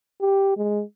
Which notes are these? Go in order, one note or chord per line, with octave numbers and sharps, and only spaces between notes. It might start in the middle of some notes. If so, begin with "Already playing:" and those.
G4
G#3